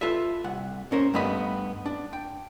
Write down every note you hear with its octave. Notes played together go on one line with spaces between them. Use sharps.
F4 A4 B4 E5
C2 F#5
A2 C#4 A#4 C5
G2 A3 B3 D#5 B5
D4
G5